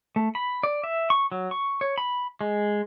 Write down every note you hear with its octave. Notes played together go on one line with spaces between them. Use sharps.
A3
B5
D5
E5
C#6
F#3
C#6
C#5
B5
G#3